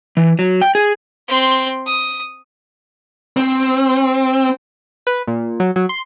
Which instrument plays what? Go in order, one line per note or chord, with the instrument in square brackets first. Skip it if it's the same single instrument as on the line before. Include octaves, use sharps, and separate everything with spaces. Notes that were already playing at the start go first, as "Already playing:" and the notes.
[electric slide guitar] E3
F#3
G5
G#4
[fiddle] C4 C6
D#6
[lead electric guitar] C4
[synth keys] B4
A#2
F#3
F#3
C6